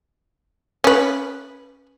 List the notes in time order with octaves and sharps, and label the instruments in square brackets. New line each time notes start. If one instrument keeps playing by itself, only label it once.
[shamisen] C#4 B4